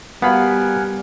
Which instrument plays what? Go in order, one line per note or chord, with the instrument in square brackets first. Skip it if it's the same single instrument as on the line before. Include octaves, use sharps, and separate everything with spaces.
[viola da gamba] G3 [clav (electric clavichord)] B3 [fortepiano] F#4 F5 B5 [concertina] A#4 F#5 G#5